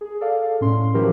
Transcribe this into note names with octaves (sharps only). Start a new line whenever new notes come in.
G#4
A4 D5 F5
A2 C#4 C6
E3 F3 E4 F#4 G4 A#4